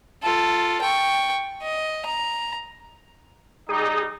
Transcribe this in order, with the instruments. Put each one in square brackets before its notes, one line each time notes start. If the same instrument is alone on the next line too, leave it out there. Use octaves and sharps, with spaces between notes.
[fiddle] F4 A4
G5 C#6
D#5
A#5
[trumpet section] G3 D#4 [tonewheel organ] G#4